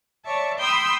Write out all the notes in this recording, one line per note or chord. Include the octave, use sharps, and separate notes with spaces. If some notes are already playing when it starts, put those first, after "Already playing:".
C#5 D5 E5 A5 C#6
G5 B5 C6 D#6 E6 G6